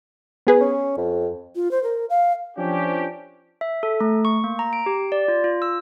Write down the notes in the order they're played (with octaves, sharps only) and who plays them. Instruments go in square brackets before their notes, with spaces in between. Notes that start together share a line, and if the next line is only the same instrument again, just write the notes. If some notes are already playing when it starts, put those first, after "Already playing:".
[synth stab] B3 G#4 B4
[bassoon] C#4
F2
[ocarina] F4
C5
A#4
F5
[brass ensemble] F3 C#4 D4 G4
[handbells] E5
A4
A3
C#6
A#3
A#5
D7
G4
D5
F4
F4
E6